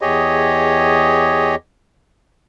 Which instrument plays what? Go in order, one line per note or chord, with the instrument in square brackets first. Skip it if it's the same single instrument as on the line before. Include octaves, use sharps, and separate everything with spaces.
[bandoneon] E2 G4 G#4 C#5 D#5